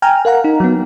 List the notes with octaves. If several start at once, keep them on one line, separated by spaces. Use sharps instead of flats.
G5 G#5 A#5 F6
A#4 F5 F#5 A#5
D#4
F#3 B3